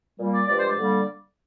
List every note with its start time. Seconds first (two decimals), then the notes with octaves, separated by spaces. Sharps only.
0.18 A#2 G3 A#3
0.33 D5
0.47 G2 F3 G#3 D5
0.58 C5
0.68 D5
0.78 D3 G3 A#3